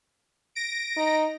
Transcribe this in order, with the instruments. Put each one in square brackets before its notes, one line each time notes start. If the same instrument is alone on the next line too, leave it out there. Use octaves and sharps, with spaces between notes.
[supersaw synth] A#6 D7
[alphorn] D#4